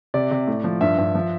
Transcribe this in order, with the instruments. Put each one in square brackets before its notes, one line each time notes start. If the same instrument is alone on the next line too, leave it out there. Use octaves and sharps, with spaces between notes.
[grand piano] C3 D5
C3
A2
F3
G2 E5
G2
F3